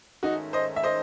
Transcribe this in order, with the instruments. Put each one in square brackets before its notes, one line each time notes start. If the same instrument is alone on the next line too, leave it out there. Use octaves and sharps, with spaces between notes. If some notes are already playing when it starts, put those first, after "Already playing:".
[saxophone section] G#2 D#3 A3 C#4 [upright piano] D#4 F#4
[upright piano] C5 D#5
E5
C5 D#5